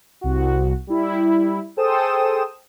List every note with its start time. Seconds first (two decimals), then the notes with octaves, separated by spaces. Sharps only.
0.21 C2 F#4
0.87 G3 E4
1.77 G#4 A4 C5 G5 D#6 E7